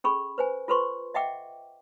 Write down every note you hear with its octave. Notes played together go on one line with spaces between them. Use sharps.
C#4 G#4 A4 B5 C#6
B4 C5 G#5
F4 A4 B4 C5 C6 C#6
D#5 E5 F#5 G5 D6